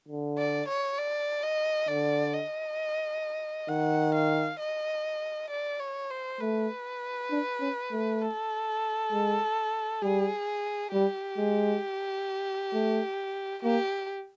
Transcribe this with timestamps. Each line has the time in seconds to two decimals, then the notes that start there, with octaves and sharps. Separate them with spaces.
0.08 D3
0.38 D5
0.68 C#5
0.98 D5
1.43 D#5
1.88 D3 D5
2.34 D#5
3.69 D#3 F#5
4.14 F5
4.60 D#5
5.50 D5
5.80 C#5
6.11 C5
6.41 A3 B4
7.31 D4
7.61 C#4
7.92 A3
8.22 A4
9.12 G#3
10.02 G3 G#4
10.93 G3 G4
11.38 G#3
12.73 A3
13.63 A#3 G4